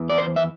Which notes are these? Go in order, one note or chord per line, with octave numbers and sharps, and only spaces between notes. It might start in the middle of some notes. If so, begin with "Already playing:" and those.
Already playing: E2 E3
D5
C5
E5